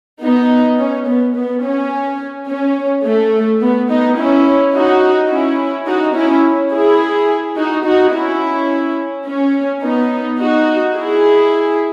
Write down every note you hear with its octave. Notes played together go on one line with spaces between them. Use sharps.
B3 D#4
C#4
B3
B3
C#4
C#4
A3
B3
B3 D#4
C#4 E4
D#4 F#4
C#4 E4
D#4 F#4
C#4 E4
E4 G#4
D#4 F#4
D#4 F#4
C#4 E4
C#4
B3 D#4
D#4 F#4
E4 G#4